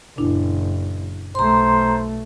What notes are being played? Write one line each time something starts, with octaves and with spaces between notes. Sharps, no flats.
F#1 A#2 D4 E4
B1 A3 C5 A#5 C6